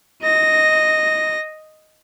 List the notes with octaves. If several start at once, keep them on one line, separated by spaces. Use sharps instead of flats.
D#5 A#6